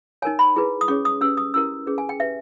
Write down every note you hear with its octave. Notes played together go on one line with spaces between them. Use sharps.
D#4 A#4 C#5 G#5
B5
E4 G#4 B4
D#6
C#4 G#4 C#5 C#6
D#6
C#4 G4 B4 E6
D#6
C#4 E4 G4 A#4 E6
C#4 G#4 B4
G#5
G5
G4 B4 E5